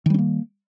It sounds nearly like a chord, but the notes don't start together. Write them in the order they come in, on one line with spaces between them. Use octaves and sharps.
D#3 G3 C#4 A#3